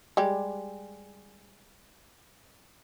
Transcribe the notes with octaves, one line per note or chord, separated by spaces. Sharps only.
G3 G#3 G4